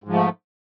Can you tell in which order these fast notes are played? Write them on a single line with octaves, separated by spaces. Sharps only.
G#2 F3 A3